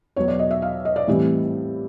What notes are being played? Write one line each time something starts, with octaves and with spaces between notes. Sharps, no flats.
E2 B2 F#3 C#5
D5
D#5
E5
F5
D#5
D5
A2 E3 G3 C4